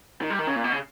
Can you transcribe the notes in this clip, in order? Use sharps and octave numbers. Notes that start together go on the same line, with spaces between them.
D#3
G3
D#3
C#3
A#2
B2
C#3